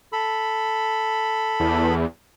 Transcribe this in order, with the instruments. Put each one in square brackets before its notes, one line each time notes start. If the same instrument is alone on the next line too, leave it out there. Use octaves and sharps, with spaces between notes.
[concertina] A4 B5
[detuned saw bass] E2